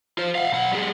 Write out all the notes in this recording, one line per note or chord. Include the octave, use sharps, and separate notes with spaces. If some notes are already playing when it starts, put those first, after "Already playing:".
F4 C5
F5 F#5
B1 F#5
G3 G#4